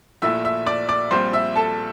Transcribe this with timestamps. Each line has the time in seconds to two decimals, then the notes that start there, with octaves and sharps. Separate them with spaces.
0.22 A#1 A#2 A3 E4 E5 E6
0.45 E5 E6
0.66 D5 D6
0.89 D5 D6
1.11 A#1 A#2 G3 C4 C5 C6
1.33 E5 E6
1.56 A4 A5